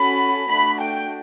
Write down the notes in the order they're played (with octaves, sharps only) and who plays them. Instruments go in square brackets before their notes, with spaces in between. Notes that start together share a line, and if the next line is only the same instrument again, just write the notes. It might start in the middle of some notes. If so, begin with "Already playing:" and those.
Already playing: [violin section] C#4 F#4 A4 B5
A3 D4 F#4 B5
G5